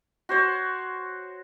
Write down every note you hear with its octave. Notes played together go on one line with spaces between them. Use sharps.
F#4 C5 C#5